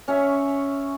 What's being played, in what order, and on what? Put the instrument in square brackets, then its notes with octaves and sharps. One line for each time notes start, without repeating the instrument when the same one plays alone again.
[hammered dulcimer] C#4 C#5 E5 C#6